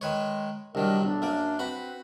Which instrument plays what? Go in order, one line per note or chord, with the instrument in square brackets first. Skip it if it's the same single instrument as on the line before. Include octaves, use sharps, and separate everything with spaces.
[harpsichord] D#3 B4 C#5 [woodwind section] G#3
[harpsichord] C2 D#3 F#3 [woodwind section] D4 A#4
[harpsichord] B1 [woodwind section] D4
[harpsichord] F#2 A#3 D5
[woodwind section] C4 B4 [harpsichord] F#4 B5